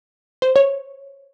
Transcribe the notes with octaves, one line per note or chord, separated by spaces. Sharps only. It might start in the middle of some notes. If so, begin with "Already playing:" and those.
C5
C#5